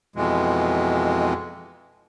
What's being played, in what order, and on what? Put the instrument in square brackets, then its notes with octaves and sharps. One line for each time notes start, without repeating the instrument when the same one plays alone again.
[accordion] F2 B2 E3 G#3